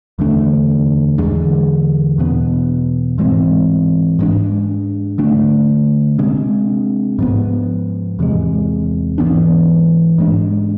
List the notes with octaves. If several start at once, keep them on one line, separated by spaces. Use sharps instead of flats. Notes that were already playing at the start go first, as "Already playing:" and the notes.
E2 D3 A3 D4
E2 D3 G#3
E2 B2 B3
G#2 E3 G#3 C4
G#2 G#3 D4
D3 A3 D4
C3 G#3 D4
G#2 F3 B3
E2 C3 G#3
G#2 E3 B3 D4
G#2 G#3 D4